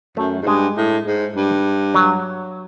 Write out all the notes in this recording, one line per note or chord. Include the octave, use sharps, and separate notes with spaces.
F#2 A3
G#2
G2 G#3
A2
G#2
G2
F#3